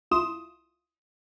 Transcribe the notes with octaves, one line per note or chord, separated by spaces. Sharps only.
C2 E4 F4 C6 D#6 E7